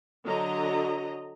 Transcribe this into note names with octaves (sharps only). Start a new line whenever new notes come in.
D3 F#3 D#5 A#5